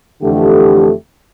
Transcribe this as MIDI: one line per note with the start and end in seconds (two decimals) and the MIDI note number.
0.23 0.92 41
0.23 0.92 50
0.23 0.92 52
0.23 0.92 57
0.23 0.92 67